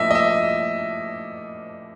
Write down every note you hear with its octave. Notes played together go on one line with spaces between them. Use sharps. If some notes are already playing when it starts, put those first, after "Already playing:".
Already playing: A2 F3 A#3 D4 D#5 E5
D#5
E5